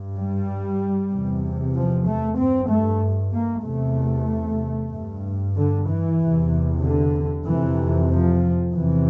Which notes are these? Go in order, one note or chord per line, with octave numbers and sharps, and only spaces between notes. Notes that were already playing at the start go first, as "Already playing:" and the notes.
Already playing: G2
G3
E2 C3
F3
A3
G2 C4
A3
A#3
E2 C3 A3
G2
D3
E3
E2 C3
D3
F2 C3 E3
F3
E2 C3 E3